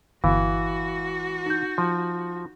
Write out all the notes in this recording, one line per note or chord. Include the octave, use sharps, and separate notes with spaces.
G1 E3 F#4 F5
D#4 G6
F3